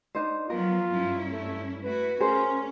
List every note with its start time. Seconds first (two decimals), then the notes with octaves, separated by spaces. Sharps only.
0.15 D4 D#4 C5
0.50 F3 F#3 B3 F4 A#4
0.92 G2 C#4 E4
1.31 A3
1.84 A3 E4 F#4 B4
2.20 A3 C#4 G#4 A#4 C5